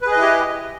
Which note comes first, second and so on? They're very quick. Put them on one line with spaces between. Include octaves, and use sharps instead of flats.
B4 G#4 D#5 E4 G4